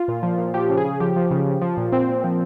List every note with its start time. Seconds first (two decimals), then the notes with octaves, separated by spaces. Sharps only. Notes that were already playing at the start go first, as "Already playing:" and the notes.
Already playing: F4
0.08 A#2
0.23 F3
0.38 A#2
0.54 F3 G4
0.70 C#3
0.77 G#4
0.85 C#3
1.00 F3 G4
1.16 F3
1.31 C#3
1.46 F3
1.62 F3
1.77 A#2
1.92 A#2 C4
2.09 A#2
2.24 F3